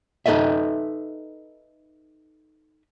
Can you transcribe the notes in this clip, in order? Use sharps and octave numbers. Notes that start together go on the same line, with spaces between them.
D#4 A4 B4 D#5 E5